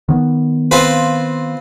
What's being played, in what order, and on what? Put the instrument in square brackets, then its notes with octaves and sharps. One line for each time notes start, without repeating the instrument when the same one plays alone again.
[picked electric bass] D#3 B3
[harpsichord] C4 F4 B4